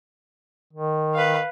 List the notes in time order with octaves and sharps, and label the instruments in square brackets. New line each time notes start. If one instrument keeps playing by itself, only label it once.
[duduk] D#3
[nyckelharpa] B4 F5